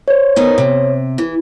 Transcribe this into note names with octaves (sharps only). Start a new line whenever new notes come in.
C5 C#5
D#3 B3 D#4
C3
E3